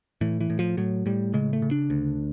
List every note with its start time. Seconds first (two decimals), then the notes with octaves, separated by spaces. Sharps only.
0.21 A2 E3
0.41 E3
0.50 A2
0.59 F3
0.77 A2 F#3
1.06 A2 G3
1.34 C#3 G#3
1.53 A3
1.62 C#3
1.71 D4
1.90 D2